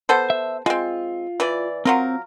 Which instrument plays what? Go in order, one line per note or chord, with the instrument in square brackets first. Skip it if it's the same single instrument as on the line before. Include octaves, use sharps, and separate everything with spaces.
[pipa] B3 A4 C5
[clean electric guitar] E5
[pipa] G#3 C4 [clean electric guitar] F4
[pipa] E3 B4 D5
[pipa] F#3 F4 A#4 [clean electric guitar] C4